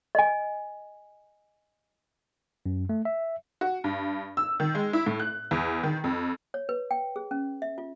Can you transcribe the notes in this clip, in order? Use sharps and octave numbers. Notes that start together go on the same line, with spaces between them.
D#5 G#5
F#2
A3
E5
F#4
G2
E6
D#3
G#3
E4
A2
F#6
E2
D#3
F2
C#5
B4
G5
G#4
C#4
E5
F4